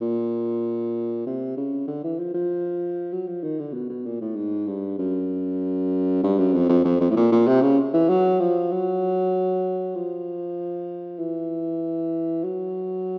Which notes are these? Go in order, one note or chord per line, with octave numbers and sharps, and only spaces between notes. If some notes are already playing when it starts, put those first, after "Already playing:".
A#2
C3
C#3
D3
E3
F3
F3
F#3
F3
D#3
D3
B2
B2
A#2
A2
G#2
G2
F#2
G2
F#2
F2
F2
F2
F2
A2
A#2
A#2
C3
C#3
E3
F#3
F3
F#3
F3
E3
F#3